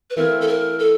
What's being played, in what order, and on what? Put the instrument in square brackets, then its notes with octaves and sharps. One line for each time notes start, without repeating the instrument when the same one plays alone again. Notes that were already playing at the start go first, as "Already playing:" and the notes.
[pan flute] B4
[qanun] E3 A3 C4 F4 [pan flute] A#4
[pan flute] A4
A#4
A4